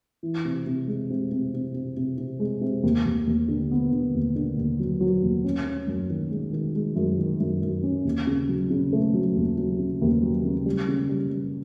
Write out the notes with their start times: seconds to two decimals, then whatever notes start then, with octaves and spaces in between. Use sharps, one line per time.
0.23 E3
0.45 C3
0.66 C3
0.87 G#3
1.10 C3
1.31 C3
1.54 C3
1.74 C3
1.97 C3
2.18 C3
2.40 G#3
2.61 C3
2.83 D#2
3.05 D#2
3.27 D#2
3.48 D3
3.71 B3
3.92 D3
4.15 D#2
4.36 D3
4.57 D#2
4.79 F#3
5.01 F#3
5.23 D#2
5.44 C#4
5.66 C#4
5.87 F#2
6.10 D#3
6.31 G#3
6.53 D#3
6.75 G#3
6.96 F#2
7.18 D#3
7.40 F#2
7.62 F#2
7.83 C#4
8.05 D#2
8.27 C#3
8.49 F#3
8.70 C#3
8.93 A3
9.14 F#3
9.35 D#2
9.57 F#3
9.79 C#3
10.01 D#2
10.22 F#3
10.45 C#3
10.66 G3
10.88 C#3
11.09 G3
11.31 G3